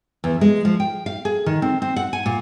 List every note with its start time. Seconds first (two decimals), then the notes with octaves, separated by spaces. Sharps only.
0.24 E2
0.41 G#3
0.65 F3
0.80 G5
1.06 F5
1.25 G#4
1.46 D#3
1.62 C4
1.82 C4
1.96 F#5
2.13 G#5
2.26 A#2